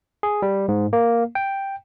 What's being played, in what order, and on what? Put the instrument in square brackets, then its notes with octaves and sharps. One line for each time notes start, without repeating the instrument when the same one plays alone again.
[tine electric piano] G#4
G3
G#2
A#3
G5